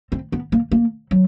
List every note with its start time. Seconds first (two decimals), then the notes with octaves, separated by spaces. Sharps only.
0.12 C4
0.32 B3
0.52 A#3
0.71 A#3
1.11 F#3